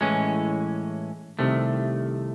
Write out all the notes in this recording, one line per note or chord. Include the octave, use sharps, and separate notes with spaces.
A2 E3 G#3 C#4
C2 C3 D#3 A3